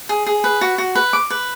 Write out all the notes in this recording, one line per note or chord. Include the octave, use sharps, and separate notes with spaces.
G#4
G#4
B4
F#4
F#4
B4
D6
B4